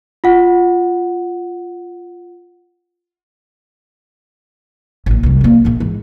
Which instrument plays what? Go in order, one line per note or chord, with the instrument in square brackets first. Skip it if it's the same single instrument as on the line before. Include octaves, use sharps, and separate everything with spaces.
[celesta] F4 F#5
[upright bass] A1 A#2
C2 F#2
G#3 A#3
A#1 A#2
G#2 E3